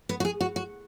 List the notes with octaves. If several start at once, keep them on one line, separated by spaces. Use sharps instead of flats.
B3
F#4
G#4
F#4
F#4